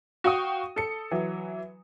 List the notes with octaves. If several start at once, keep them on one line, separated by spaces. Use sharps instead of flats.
F#4 F5 G5 C#6 D#6
A4 C#7
E3 F#3